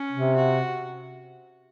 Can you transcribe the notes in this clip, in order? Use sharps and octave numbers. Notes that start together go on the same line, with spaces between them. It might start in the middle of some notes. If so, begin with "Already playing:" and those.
Already playing: C#4
C3
F#4